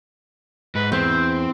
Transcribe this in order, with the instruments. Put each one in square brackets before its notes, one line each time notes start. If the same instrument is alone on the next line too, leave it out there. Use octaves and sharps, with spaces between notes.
[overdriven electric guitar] G#2 [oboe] B4
[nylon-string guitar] E2 [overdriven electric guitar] C4 [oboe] C5